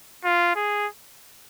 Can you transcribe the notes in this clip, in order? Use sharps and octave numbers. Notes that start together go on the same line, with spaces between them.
F4
G#4